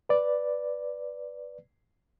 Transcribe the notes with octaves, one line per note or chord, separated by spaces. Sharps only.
B4 D5